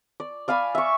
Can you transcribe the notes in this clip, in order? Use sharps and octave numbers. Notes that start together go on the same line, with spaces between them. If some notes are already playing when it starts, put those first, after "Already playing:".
D5
D5 F5 G#5 B5
E5 C#6